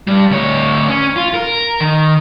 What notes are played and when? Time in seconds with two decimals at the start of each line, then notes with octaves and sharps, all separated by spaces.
0.08 G2 G3
0.31 D2 C#5
0.89 C#4
1.16 F4
1.34 A#4
1.80 D#3